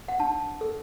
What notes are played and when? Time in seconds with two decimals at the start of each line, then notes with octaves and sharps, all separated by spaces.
0.08 F#5
0.20 D4 A5
0.61 A4